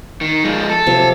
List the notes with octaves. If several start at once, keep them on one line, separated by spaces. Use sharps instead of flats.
D#3
F3 G#3
A4
C3 F3 F#3